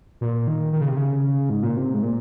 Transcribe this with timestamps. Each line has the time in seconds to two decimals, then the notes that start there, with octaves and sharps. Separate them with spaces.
0.21 A#2
0.47 D#3
0.73 D#3
0.81 C#3
0.89 C3
0.96 C#3
1.50 G#2
1.63 A#2
1.77 C3
1.94 G#2
2.03 A#2